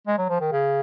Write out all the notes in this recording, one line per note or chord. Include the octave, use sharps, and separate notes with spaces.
G#3
F#3
F3
D#3
C#3